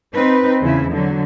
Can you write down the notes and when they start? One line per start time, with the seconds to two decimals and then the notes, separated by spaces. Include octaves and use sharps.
0.14 C4 D#4 B4
0.62 E2 C#3 E4
0.91 D3 F#3